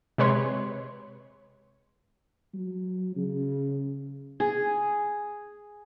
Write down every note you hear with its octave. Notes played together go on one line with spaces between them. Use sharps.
C3 G#3 B4 C#5 C6
F#3
C#3
G#4